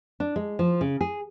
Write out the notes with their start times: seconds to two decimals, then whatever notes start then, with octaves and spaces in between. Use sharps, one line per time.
0.20 D4
0.36 G#3
0.59 F3
0.81 C#3
1.01 G#4